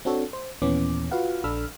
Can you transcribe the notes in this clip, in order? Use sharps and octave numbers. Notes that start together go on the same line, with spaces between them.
C4 D4 F#4 A4 C#5
C5
D#2 A#2 E3 B3 C#4 D6
F4 F#4 B4 F5 F#5
A#1 D4 A4 B5 E6 F6